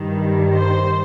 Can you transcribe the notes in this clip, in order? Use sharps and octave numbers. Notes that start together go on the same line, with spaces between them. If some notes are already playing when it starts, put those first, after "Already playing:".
Already playing: G2 D#3 G3
C5